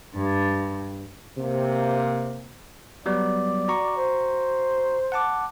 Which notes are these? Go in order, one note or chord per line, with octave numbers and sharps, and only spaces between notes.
G2
C3 A#3
F#3 G3 B3 D5
F#4 A#5 C#6
C5
F#5 A5 D6